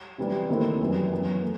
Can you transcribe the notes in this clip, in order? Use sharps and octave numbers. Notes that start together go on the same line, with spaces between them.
C3 E3 G3
D#2 D#3 A3 C4 E4
F#2 E3 G3
F#2 E3 B3
A3